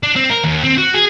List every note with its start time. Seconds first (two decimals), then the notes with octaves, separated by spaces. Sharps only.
0.03 D4
0.16 C4
0.30 A#4
0.44 D#2
0.64 C4
0.78 F#4
0.94 G#4